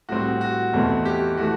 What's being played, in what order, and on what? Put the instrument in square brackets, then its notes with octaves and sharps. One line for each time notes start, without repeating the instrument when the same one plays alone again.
[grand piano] A2 G3 C4 F#4
F#4
E2 B2 A3 C4
G4
E3 A3 F#4